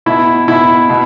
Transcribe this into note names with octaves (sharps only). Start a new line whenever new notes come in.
B2 E4
B2 E4
B2